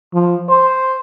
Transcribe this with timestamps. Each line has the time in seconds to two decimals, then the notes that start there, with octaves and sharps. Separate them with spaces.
0.14 F3
0.49 C5